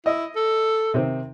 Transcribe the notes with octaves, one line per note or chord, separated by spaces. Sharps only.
E4 D#5
A4
C3 D#3 C4